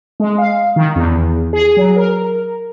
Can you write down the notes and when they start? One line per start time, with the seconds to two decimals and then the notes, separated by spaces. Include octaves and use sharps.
0.20 G#3
0.38 F5
0.76 D#3
0.96 E2
1.53 G#4
1.77 F#3
1.97 A#4